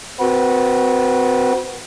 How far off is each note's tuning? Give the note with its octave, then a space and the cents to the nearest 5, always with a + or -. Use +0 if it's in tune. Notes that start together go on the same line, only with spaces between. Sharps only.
C4 -25 F#4 +0 B4 -30